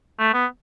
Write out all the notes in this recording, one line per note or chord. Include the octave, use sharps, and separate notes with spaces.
A3
B3